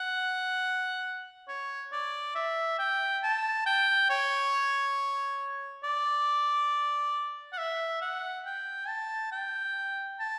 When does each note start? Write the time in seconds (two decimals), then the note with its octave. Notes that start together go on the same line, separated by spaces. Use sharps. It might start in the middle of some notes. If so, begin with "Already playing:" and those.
Already playing: F#5
1.49 C#5
1.93 D5
2.36 E5
2.79 G5
3.23 A5
3.66 G5
4.10 C#5
5.84 D5
7.53 F#5
7.58 E5
8.02 F#5
8.46 G5
8.88 A5
9.32 G5
10.20 A5